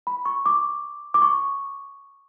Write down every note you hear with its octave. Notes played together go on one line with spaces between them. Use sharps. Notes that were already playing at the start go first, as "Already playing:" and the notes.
B5
C#6
D6
D6
C#6